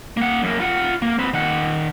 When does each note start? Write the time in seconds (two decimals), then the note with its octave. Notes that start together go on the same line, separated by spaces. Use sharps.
0.17 A#3 F#5
0.43 F#2 A#3
0.60 F4 F#5
1.02 A#3
1.19 C4 B4
1.34 D#3 F#5